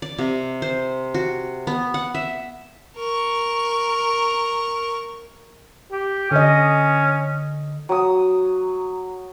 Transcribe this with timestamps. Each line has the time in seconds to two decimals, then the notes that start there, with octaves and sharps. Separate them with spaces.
0.02 D5
0.18 C3
0.62 C5
1.14 F#4
1.67 B3
1.94 F#5
2.15 E5
2.96 A#4 C#6
5.92 G4
6.31 D3 C#4 D#5
7.89 F#3 D#6